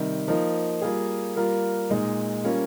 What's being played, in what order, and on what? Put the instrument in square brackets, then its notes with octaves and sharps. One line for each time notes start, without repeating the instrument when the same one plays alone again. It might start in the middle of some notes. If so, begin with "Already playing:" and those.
Already playing: [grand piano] C3 D#3 G3
F3 A#3 D#4
G3 A#3 F4 G#4
G3 A#3 F4 A#4
A#2 G#3 D#4
G3 A#3 C#4 F4